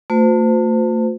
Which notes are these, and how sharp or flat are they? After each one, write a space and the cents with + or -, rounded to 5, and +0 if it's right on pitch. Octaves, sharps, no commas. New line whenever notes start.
A3 +35 F4 +45 C5 -35